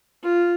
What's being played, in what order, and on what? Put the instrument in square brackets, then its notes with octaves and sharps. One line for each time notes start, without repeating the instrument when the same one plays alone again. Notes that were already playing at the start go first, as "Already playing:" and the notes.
[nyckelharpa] F4